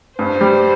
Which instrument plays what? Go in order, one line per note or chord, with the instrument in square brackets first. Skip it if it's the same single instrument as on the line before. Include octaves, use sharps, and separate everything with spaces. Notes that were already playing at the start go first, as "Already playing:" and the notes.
[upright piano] G2 [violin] C5
[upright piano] G3